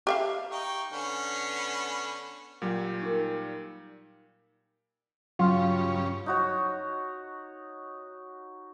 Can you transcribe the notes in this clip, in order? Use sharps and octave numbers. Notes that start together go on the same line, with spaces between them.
G4 E5 F5
D#4 G5 C#6
D3 B3 C#4
A#2 F#3 G3
D#4 A#4
G2 C#3 F#3 C#4 F4
D#4 F#4 C#5